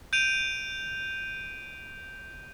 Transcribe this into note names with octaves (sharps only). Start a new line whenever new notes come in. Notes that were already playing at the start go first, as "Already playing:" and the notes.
G6 D7 D#7 F7